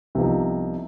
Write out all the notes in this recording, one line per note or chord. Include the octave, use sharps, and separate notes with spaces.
C2 C3 F3 B3 D#4